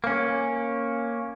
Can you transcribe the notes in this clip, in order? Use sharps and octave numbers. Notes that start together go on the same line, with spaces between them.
A#3 C#4